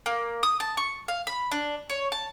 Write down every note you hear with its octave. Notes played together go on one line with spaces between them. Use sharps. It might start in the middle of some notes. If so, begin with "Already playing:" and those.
A#3
D#6
A5
C#6
F5
B5
D4
C#5
A5